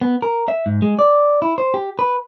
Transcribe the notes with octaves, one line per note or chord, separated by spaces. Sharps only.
B3
A#4
E5
G#2
G#3
D5
E4
C5
G4
B4